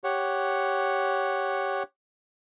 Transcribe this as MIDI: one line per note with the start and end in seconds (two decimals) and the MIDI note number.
0.04 1.83 67
0.04 1.83 73
0.04 1.83 78